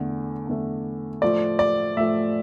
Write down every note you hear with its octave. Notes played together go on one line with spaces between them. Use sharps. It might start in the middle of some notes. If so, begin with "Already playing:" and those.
Already playing: E2 D3 A3
E2 D3 A3
A2 F3 A3 D5
D5
A2 F3 A3 E5